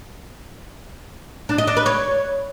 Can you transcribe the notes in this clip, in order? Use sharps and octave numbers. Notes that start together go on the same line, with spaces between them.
D4
D#5
D4
B4
C#5